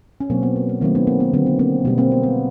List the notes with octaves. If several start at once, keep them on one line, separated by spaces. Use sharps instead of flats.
C#4
B2 F#3 A#3 C4
B3
A#3
A#3
D#3 F#3 A3 A#3 C4
B3 C#4
A#3 C4
B3
D3 F#3 A#3 C4
B3
A#3 C4
B2 G3 A#3 B3
A#3 C4
B3
B3